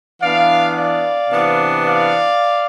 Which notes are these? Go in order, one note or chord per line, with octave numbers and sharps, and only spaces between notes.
E3 B3 D4 D5 F5
D5 F5
C3 E3 B3 D4
D5 F5